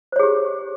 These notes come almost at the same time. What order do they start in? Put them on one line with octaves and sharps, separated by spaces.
C5 C#5 G#4 G4